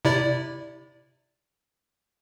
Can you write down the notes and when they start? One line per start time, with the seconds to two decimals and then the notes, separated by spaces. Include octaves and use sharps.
0.05 C3 E4 D5